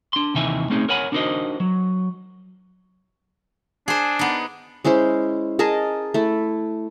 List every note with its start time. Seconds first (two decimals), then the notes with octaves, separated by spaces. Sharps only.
0.13 D4 C6
0.34 D#2 C3 E3 D#4 E5 G#5
0.70 A3 C4 C#4 D#4 G#4
0.89 A#4 C#5 F#5 G#5 B5
1.12 D4 D#4 F#4 A#4 C5 D#5
1.60 F#3
3.88 D4 G#4 C5
4.19 B3 D#4
4.84 G#3 C#4 E4 C5
5.59 G#4 A#4 D#5 A5
6.14 A3 E4